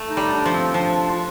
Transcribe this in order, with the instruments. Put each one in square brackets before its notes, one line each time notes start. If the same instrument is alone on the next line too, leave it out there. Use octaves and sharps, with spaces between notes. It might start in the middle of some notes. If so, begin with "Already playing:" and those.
Already playing: [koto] A3
[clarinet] D#4
[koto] G3
[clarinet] D4
[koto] F3
[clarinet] C4
[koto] F3 [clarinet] D4
[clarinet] F4